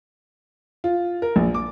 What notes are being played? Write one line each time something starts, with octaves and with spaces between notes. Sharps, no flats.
F4
A#4
A#1
D6